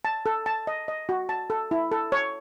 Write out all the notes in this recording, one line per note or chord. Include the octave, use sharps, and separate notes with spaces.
A5
A4
A5
D#5
D#5
F#4
A5
A4
E4
A4
C#5